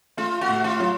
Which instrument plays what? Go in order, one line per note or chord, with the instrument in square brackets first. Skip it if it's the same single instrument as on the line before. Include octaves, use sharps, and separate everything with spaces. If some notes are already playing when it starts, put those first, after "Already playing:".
[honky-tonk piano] A3 [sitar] F4
[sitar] F#4
[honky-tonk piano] A2
[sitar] F4
[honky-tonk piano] F#3